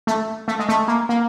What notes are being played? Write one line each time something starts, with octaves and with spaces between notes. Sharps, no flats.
A3
A3
G#3
A3
A#3
A#3